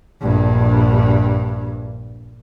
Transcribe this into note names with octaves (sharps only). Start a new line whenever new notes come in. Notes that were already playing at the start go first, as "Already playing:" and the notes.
A#1 G2